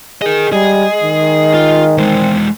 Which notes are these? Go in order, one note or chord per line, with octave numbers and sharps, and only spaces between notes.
G#4 A#4 D#5
G3 G#3 G#4
D#3
F4
E2 G#3 C4